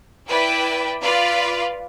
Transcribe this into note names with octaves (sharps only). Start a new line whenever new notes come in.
E4 B4 D5 G5
F4 B4 D5 F5